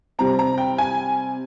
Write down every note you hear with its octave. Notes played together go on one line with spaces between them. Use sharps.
C3 G3 C4 A#5
A#5
G5
G#5